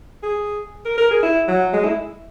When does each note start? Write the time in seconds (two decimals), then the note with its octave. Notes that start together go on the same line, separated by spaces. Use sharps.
0.23 G#4
0.85 A#4
0.98 A#4
1.11 G#4
1.23 E4
1.48 F#3
1.73 G#3
1.85 E4